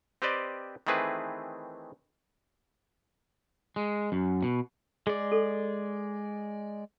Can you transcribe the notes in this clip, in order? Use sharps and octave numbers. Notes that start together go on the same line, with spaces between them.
C4 G4 B4 C5 D5 D#5
D#3 E3 A3 C4 G#4 B4
G#3
F#2
B2
G#3 G#4 D5
A4